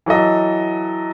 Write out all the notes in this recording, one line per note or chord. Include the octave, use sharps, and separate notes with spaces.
E3 F#3 A4 D#5